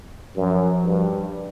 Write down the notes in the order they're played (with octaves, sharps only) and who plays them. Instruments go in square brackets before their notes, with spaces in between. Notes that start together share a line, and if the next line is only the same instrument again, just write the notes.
[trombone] F#2 [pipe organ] F3
[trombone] G2